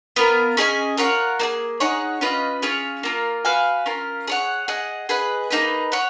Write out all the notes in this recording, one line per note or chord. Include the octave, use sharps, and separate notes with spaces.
B3 F4 A#4
C#4 G#4 D#5 G#5
F4 A#4 C#5 F#5
A#3 D#4 G#4
D#4 G#4 C#5 F#5
C#4 F4 B4 D#5
C#4 F4 G#4 C#5
A#3 F4 A#4
F#4 B4 F5 G#5
C#4 F4 A#4
G#4 C#5 F#5
G#4 D#5 F#5
G#4 B4 D#5 F#5
A#3 D#4 G#4 B4
C#5 F#5